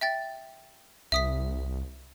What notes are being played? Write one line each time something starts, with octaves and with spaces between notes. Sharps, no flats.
E5 G5 A6
C2 E5 D#6 B6